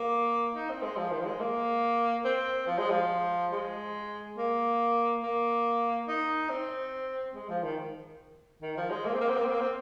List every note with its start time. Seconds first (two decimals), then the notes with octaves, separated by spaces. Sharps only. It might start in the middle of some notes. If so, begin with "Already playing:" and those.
Already playing: A#3
0.55 D#4
0.69 C4
0.83 G#3
0.97 F3
1.12 D#3
1.20 F3
1.26 G#3
1.40 A#3
2.25 C4
2.67 F3
2.78 G#3
2.90 F3
3.52 G#3
4.38 A#3
5.23 A#3
6.08 D#4
6.49 C4
7.34 G#3
7.49 F3
7.63 D#3
8.62 D#3
8.77 F3
8.90 G#3
9.06 A#3
9.14 C4
9.21 A#3
9.29 C4
9.36 A#3
9.45 C4
9.53 A#3
9.60 C4